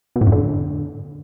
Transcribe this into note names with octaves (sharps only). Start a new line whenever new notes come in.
B2
A2
F#2
D3